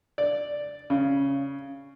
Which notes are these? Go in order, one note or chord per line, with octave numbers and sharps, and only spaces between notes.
D5
C#3